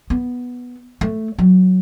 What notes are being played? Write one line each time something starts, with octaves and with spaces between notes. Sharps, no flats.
B3
A3
F#3